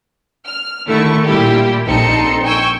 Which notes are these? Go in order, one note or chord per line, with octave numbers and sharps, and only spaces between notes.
F6
D3 D#3 A3 E4 C#6
A#2 G3 E4 G4
A#1 C4 D#4 A4 C6 C#7
G5 G#5 C#6 E6 G6